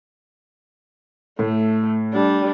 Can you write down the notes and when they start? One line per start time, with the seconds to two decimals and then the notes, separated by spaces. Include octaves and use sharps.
1.39 A2 A3
2.13 G3 D4